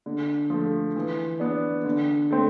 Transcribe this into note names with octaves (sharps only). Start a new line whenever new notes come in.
D3
F3 A3
E3
B3 D4
D3
A3 C4